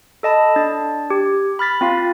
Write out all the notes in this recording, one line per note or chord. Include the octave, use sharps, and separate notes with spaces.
A4 D#5 A5 B5
D4 A6
G4
B5 F6 A6 B6
C4 F4 F5